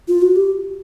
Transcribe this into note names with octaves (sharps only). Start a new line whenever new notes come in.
F4
F#4
G4